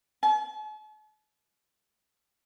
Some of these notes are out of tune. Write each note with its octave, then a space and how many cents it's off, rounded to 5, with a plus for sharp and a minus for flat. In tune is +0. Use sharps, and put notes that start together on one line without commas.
A5 -45